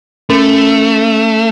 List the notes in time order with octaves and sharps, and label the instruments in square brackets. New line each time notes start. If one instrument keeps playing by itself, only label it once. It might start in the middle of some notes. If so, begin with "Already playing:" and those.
[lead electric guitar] A3 [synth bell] C#4